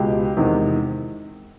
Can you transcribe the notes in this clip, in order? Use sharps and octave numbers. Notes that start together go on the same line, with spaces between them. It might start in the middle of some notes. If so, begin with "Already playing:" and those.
Already playing: C#2 B2 G#3 G4
E2 C3 D#3 G#3